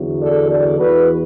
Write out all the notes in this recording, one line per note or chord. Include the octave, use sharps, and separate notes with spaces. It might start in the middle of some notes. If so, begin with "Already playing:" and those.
Already playing: E2 D3 F#3
A4 D5
A4 D5
E2 E3 F#4 B4